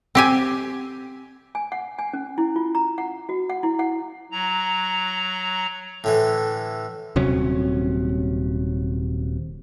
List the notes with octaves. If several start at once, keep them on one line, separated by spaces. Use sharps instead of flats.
C4 G4 G#5
G#5
F#5
G#5
C#4
E4
F4
A#5
F#5
F#4
F#5
E4
F#5
F#3 A#5
A2 D3 E3
D#1 C3 F#3 C#4